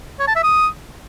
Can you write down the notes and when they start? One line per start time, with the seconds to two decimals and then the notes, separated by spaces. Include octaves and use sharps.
0.20 C#5
0.28 A5
0.35 E5
0.43 D#6